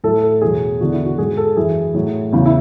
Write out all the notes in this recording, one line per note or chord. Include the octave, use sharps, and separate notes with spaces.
A2 F#3 A4
A4
E2 B2 F#3 G#4
E2 D3 F#3 F#4
E4
F#4
G#2 F#3 G#4
A4
F#2 E3 G#4
A2 F#3
E2 C#3 F#3
E4